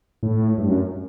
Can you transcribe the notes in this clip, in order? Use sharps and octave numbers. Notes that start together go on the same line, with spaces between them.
A2
G2
F#2